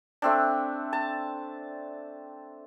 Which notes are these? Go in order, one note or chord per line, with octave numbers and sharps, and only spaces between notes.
A3 C4 D4
A5